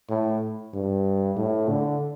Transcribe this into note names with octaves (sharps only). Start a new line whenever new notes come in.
A2
G2
A2
D3